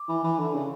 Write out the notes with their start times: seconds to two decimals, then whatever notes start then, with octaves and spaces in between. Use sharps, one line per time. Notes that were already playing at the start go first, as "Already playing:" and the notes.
Already playing: D6
0.08 E3
0.24 E3
0.39 D3
0.54 C#3